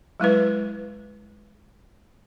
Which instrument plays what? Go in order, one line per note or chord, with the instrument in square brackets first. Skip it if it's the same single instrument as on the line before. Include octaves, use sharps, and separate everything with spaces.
[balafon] F#3 G#3 E4 B4